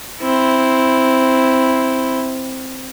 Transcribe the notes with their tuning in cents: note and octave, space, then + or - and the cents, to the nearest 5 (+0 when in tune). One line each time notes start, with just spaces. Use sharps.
C4 +0 E4 +0